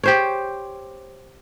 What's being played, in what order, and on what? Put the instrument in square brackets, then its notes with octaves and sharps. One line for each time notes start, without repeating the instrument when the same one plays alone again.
[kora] G4 C5 C#5